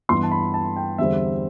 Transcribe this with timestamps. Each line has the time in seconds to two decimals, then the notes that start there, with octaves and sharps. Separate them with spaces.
0.09 G2 E3 B3 C6
0.23 A5
0.32 B5
0.54 A5
0.76 G5
0.98 E2 D3 G3 C4 E5